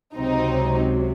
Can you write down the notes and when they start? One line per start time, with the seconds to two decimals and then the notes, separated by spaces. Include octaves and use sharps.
0.16 C#2 C3 F#3 C4 D#4